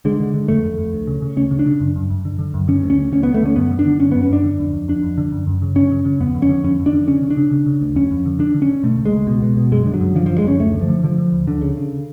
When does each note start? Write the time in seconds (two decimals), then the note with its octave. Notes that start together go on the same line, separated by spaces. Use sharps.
0.05 D3 G#3
0.20 D3
0.34 D3
0.48 F2 A3
0.63 F2
0.78 F2
0.93 D2
1.07 C#3
1.22 C#3
1.37 D2 C#4
1.51 C#3
1.59 D4
1.66 C#3
1.81 F#2
1.96 F#2
2.10 F#2
2.25 D3
2.39 D3
2.54 F#2
2.68 D3 C#4
2.83 D2
2.90 C#4
2.98 D2
3.12 D2 C#4
3.23 D2 B3
3.34 A3
3.42 D3 C#4
3.56 F#2 B3
3.72 D3
3.79 D4
3.86 D3
4.00 F#2 C#4
4.11 F#2 B3
4.23 C#4
4.30 F#2 D4
4.44 D3
4.59 F2
4.73 F2
4.88 F2 D4
5.03 F2
5.18 D3
5.32 F#2
5.47 F#2
5.62 C#3
5.75 F#2 C#4
5.91 C#3
6.05 C#3
6.20 F2 B3
6.35 F2
6.42 C#4
6.49 D3
6.64 F2 C#4
6.79 F2
6.86 D4
6.93 D3
7.07 C#3 C#4
7.23 C#3
7.30 D4
7.37 C#3
7.51 C#3
7.66 C#3
7.81 D2
7.95 F2 C#4
8.11 F2
8.26 D3
8.39 D3 D4
8.54 D3
8.62 C#4
8.69 D3
8.83 B2 A3
8.98 C#2
9.05 G#3
9.12 C#2
9.27 B2
9.42 B2
9.57 B2
9.72 F#2 G#3
9.86 D3
9.94 F#3
10.00 F#2
10.15 D3 F3
10.26 F#2 F3
10.38 G#3
10.44 F#2 C#4
10.60 D2 A3
10.74 D3
10.81 F3
10.88 D3
11.03 D3 F3
11.18 D3
11.33 D2
11.47 D2 D3
11.62 C#3
11.77 C#3